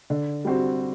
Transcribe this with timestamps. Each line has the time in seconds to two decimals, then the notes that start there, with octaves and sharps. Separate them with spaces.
0.10 D3
0.45 G3 C4 F#4